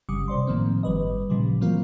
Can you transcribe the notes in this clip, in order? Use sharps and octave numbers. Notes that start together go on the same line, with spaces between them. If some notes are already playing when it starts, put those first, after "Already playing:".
G1 C#3 G3 D6 D#6 C#7
C3 C5 D5 C6
A2 D#3 F3 A#3 C4
G1 G3 B4 D#5
A#2 C#3 F3 G3
E3 F#3 A#3 C4 F4 A#4